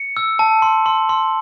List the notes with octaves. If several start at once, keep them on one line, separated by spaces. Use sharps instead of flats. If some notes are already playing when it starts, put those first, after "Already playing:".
Already playing: C#7
E6
A5
C6
C6
C6